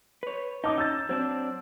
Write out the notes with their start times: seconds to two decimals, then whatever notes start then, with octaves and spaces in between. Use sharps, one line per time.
0.23 B4 C#5
0.64 C#4 D#4 A5 D6 D#6
0.78 E6 G6 A6
1.09 F#3 C4 D4 C5